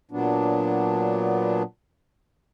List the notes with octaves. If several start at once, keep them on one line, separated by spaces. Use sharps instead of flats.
A#2 F#3 B3 D4